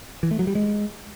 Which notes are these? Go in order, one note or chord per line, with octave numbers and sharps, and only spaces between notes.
E3
A3
F#3
G3
G#3